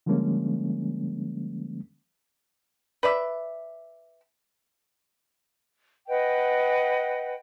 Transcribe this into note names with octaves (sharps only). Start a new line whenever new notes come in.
D3 F3 G3 G#3 A#3 C#4
B4 D5 E5
B4 D#5 F#5 G5